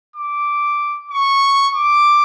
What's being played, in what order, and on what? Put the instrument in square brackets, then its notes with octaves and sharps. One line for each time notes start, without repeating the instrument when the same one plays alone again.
[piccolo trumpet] D6
C#6
D6